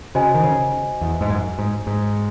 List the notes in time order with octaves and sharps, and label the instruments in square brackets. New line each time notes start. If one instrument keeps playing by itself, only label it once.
[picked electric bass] C#3 [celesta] F#4 C5 D#5 G#5
[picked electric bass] D#3
C#3
E2
G#2
F#2
G#2
G#2